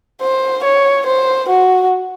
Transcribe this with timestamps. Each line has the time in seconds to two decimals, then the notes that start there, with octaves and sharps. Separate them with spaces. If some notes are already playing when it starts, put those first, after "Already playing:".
0.21 C5
0.64 C#5
1.06 C5
1.48 F#4